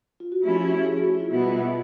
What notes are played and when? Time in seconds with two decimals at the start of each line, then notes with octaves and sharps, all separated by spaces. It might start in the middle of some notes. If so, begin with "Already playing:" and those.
0.20 F4
0.32 F#4
0.43 F3 A3 C#4 E4 G4
0.86 G#4
0.98 F#4
1.14 E4
1.19 F4
1.30 B2 G3 B3 E4